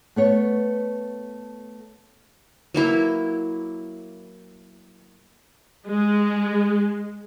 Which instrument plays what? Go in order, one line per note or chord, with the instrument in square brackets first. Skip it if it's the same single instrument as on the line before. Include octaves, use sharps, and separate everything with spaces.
[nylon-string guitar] A3 B3 C#5
[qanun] F#3 A#3 E4
[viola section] G#3